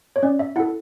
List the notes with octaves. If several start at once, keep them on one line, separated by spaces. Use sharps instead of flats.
C#5
C#4 D5
E5
E4 A4 F#5